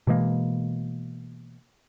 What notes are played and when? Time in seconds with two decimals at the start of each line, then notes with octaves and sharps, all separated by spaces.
0.07 B2 E3 G#3 A#3